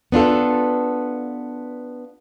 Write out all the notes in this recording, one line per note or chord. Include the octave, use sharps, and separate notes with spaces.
B3 D4 F4 A4